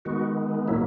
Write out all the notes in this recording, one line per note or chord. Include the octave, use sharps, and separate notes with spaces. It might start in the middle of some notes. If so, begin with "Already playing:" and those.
D#3 G#3 B3 F#4
A#2 F#3 A#3 E4